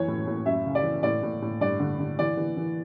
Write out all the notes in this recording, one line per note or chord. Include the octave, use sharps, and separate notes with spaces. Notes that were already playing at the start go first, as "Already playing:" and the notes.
Already playing: F#2 E3 C#5
A2
A2
F#2 E5
C#3
D5
E3
A2 D5
A2
A2
G2 D5
D3
D3
E3 D5
E3
E3